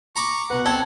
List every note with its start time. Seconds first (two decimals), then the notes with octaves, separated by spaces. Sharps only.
0.16 A#5 B5 C#6 D6
0.50 B2 B4 F#5
0.66 C4 A4 G#6